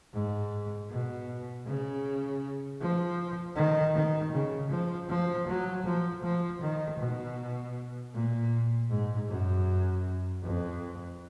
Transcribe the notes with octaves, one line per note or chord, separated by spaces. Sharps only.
G#2
B2
C#3
F3
D#3
D#3
C#3
F3
F3
F#3
F3
F3
D#3
B2
A#2
G#2
F#2
F2